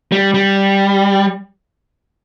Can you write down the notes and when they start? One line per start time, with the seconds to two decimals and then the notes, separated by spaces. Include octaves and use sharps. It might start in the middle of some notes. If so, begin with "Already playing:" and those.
0.12 G3
0.34 G3